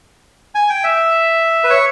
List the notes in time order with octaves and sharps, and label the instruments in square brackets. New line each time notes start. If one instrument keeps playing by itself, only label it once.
[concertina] G#5
G5
E5
B4
C#5